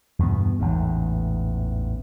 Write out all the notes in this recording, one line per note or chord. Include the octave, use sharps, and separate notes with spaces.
E2 G2 B2 B3
A1 E2 G#2